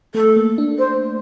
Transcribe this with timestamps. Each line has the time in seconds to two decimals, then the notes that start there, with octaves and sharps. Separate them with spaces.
0.15 A3 A4
0.36 A#3
0.58 D4
0.78 C5